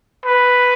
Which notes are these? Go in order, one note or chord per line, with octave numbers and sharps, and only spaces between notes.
B4